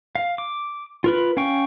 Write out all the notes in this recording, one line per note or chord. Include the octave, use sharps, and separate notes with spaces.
F5
D6
F4 A#4 B4
C#4 F5 G5 C#6